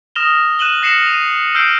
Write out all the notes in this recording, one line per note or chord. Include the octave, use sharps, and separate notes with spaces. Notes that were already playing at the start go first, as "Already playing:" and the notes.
D#6 F6 A#6 E7 F7 G7
F#6 D#7 E7 F#7 G7
F6 A#6 C7 C#7 E7 F#7
D#7 F7
E6 F6 G6 C7 D7